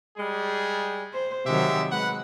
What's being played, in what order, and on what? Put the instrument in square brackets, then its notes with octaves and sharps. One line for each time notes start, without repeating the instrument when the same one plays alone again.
[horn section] G3 G#3 G#4
[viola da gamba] C5
[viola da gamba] C3 D#3 F#3 [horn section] G#3 G4 E5
[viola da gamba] G#3 [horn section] B4 F#5